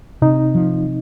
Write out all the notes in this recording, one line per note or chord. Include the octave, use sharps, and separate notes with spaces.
C3 D#4
F3